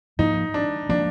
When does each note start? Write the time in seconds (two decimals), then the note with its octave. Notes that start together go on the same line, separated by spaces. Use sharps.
0.19 G#2 F3 A#3 D#4
0.54 D4
0.89 F3 A#3 D4